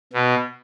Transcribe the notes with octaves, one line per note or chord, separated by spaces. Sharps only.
B2